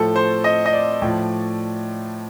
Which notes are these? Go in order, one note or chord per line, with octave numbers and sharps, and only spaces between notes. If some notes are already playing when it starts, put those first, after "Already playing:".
Already playing: A2 F3 A4
C5
D#5
D#5
D5
A2 F3